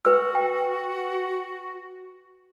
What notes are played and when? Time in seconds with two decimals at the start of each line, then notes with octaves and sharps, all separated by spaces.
0.05 F#4 B4 E6
0.35 G5